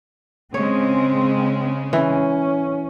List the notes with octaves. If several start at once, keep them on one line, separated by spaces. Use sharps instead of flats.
C#3 G#3 C4 C#5
E3 C#4